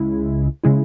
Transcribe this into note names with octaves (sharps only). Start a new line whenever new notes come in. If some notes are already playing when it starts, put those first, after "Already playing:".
Already playing: C#2 C#3 G#3 E4
C#3 G#3 E4